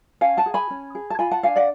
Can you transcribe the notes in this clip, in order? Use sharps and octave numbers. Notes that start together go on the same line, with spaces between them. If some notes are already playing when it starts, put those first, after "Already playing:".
C#4 F5 G#5
F#5 A5
G#4
G#5 B5
C#4
G#4
A5
F4 G#5 B5
F#5 A5
D4 F5 G#5
D5 F#5